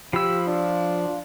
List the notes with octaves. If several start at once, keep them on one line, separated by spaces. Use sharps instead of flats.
F3 G4 B5 E6
D4 F4